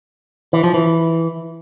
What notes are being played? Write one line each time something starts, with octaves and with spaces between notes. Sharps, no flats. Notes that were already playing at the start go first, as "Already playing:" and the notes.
E3
F3
E3